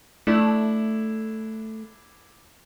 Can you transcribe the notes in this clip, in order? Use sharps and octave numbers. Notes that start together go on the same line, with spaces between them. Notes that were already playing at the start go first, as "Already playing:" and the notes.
A3 D4 E4